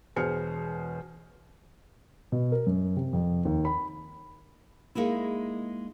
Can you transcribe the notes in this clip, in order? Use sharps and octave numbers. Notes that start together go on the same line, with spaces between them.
E1 B2 G#4 C5 F6 C#7
B2
A#4
F#2
C3
F2
D#2
B5
G#3 A#3 D#4 E4